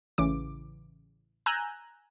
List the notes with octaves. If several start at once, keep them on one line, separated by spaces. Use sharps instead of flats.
A1 C#3 E3 D6
G#5 A#5 E6 F#6 G6